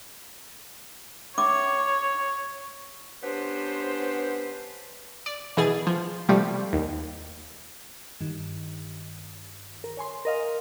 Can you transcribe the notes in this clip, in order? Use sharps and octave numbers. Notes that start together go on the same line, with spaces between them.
C#4 C#5 E5 D6
B3 C#4 D4 G4 B4 C5
D5
B2 E3 G#4 A6
F3
C3 F3 G3 A3
D#2
G2 D#3
A#4
C#5 G#5 C6
A#4 D#5 F5